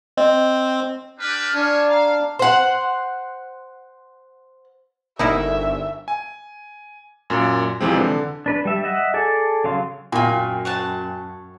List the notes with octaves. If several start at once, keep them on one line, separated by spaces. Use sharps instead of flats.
C4 D#5
D4 G4 B4 F6
D4 F4 C#5 G#5
F5 A#5
C5 F#5
G1 D#4 E4 A#4 E5
G#5
F#2 A#2
F2 C3 E3 F3 G#3 C4
D3
D4 B4
G3 E5
D#5 E5 F#5
G#4 A4 D5
C#3 F#3 F5 C6
F#2 A#2 F4 F#4 G5 G#5
C#5 F#5 A5